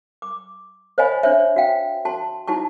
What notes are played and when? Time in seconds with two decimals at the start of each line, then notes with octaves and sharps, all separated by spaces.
0.22 D6
0.98 C5 C#5 D#5 F5 G#5 B5
1.23 D4 C5 C#5 E5
1.56 F#4 E5 F5 G5
2.05 F#4 A5 C6
2.48 D#4 E4 F#4 A5 C#6